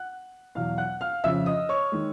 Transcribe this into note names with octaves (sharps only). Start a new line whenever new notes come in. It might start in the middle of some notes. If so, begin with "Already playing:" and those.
Already playing: F#5 F#6
E2 B2 F#3 F5 F6
F#5 F#6
F5 F6
F2 C#3 F3 E5 E6
D#5 D#6
C#5 C#6
D#3 G#3